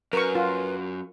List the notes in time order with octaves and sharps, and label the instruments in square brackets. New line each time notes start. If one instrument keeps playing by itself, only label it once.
[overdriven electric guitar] F#2 [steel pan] A#4 C#6 [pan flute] B4
[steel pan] F4